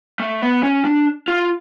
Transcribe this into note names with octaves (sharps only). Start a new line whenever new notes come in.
A3
B3
C#4
D4
F4